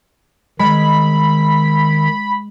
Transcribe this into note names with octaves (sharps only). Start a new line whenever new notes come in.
D#3 G#3 B5